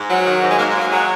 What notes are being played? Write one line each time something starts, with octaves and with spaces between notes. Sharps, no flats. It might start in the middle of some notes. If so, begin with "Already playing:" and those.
Already playing: G#2
F#3
D#3
G#2
G#3
G#2 A#3
G#3
F#3
A#3
F#3 G#3